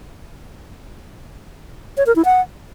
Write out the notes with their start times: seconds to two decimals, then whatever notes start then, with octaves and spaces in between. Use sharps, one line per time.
1.97 C#5
2.06 A#4
2.16 E4
2.25 F#5